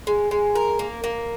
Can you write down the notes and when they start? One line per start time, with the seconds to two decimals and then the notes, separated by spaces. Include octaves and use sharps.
0.07 G#3
0.31 G#3
0.55 A#4
0.79 A#3
1.04 A#3